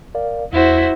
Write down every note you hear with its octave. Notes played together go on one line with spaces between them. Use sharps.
A#4 D5 F5
E2 E4 F#4 C5